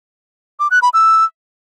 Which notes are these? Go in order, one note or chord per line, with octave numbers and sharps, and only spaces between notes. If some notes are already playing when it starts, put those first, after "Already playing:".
D6
F#6
B5
E6